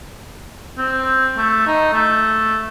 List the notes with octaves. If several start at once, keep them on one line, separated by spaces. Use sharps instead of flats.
C4
A3
D#4
A3